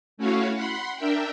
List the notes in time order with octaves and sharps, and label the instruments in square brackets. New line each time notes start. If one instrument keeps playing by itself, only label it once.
[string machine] A3 C#4 E4 F#4 C#5 F5
F#5 B5 C6
D4 A#4 E5 G5